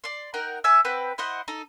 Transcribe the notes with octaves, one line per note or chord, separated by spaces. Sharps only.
D5 C6
D#4 A#4 F#5 G5
C#5 E5 G#5 E6
C4 B4 F#5 G5
E4 C5 D#5 F#5
D#4 A4